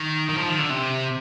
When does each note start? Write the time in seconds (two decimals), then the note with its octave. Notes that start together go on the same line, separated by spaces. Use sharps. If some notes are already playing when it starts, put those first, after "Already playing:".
Already playing: D#3
0.29 D#3
0.37 F3
0.48 D#3
0.59 D3
0.70 C3